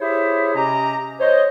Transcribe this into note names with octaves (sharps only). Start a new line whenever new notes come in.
E4 G4 G#4 C5 C#5 E5
C3 C#4 G4 D#5 A#5
C5 C#5 D#5